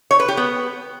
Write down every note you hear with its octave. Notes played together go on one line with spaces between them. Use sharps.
C#5
B4
G4
B3